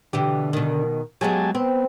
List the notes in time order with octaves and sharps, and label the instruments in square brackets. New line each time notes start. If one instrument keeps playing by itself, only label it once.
[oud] B2 E3 G4 [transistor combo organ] D3
[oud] B2 D#3
[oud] F#3 G#3 B3 [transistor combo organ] G4 G#5 A5
[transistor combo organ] B3 [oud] C4